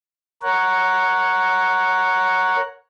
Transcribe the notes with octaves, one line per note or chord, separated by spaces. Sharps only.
A#4 C#5 F#5